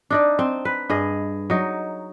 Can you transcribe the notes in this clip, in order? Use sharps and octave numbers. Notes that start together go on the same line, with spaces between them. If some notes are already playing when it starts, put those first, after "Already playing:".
D4 D#4 D5
C4
B4
G2 G#4 D#5
F#3 D#4